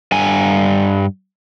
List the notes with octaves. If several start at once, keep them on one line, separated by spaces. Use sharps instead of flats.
G2 G#5